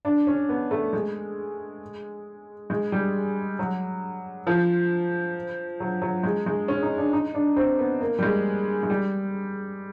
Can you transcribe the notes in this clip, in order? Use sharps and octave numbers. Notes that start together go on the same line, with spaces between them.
D4
C#4
B3
A3
G#3
G#3
G3
F#3
F3
F#3
F#3
G#3
G#3
C#4
D#4
D4
D#4
D4
C4
B3
A#3
G3
G#3
G#3
G3